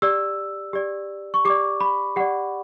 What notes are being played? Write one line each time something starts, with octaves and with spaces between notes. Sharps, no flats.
G4 D5 E6
G4 D5
C#6
G4 D5 D6
B5
G4 D5 F#5